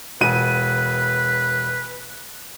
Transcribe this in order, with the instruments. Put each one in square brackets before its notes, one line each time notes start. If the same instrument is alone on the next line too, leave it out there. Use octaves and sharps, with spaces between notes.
[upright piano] E1 D#7 [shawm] B4